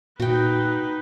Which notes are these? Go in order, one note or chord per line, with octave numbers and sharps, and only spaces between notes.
A#2 D#4 F#4 B4 G5